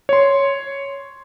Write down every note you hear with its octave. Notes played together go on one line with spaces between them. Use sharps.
C#5 C6